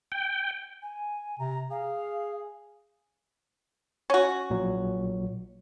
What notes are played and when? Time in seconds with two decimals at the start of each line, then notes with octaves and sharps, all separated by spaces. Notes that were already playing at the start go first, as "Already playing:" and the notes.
0.12 G5
0.82 G#5
1.39 C3 A#5
1.71 G#4 F5
4.10 C#4 F#4
4.50 A#1 A#2 F#3